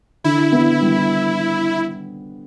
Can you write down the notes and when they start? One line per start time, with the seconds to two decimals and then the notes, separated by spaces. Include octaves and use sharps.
0.24 D3 E4
0.52 B3
0.81 G3